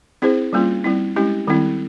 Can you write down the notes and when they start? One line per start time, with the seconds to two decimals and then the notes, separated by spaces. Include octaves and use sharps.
0.22 C4 E4 G#4 C5
0.53 G3 A#3 C#4 F4
0.84 G3 C4 E4
1.16 G#3 C#4 E4 G4
1.47 D#3 G3 C4 E4